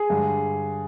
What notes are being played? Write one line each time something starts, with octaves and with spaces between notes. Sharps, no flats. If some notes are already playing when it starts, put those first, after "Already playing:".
Already playing: G#4
G2 D3 G#3